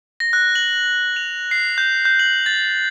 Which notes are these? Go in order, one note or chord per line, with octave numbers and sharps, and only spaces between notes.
A#6
F#6
F#7
F7
C7
G6
G6
F#7
A6